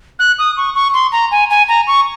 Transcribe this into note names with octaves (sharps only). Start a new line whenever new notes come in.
F#6
D#6
C#6
C#6
C6
A#5
G#5
G#5
A#5
C#6